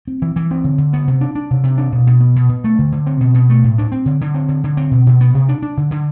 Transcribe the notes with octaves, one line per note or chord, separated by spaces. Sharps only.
C4
E3
E3
C4
D3
D3
B3
C3
D4
D4
C3
C3
D4
B2
B2
B3
B2
B2
A3
D3
D3
C4
B2
B2
A3
A2
D4
C4
D3
D3
C4
D3
D3
C4
B2
B2
B3
C3
D4
D4
D3
D3